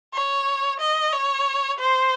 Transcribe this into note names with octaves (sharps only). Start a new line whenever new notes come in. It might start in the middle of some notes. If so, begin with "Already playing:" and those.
C#5
D#5
C#5
C5